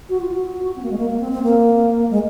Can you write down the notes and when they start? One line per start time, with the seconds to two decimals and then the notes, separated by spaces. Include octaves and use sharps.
0.09 F#4
0.20 F4
0.31 F#4
0.76 C4
0.83 A#3
0.90 G#3
0.98 A#3
1.10 A#3
1.21 C4
1.32 C4
1.43 A#3
2.10 G#3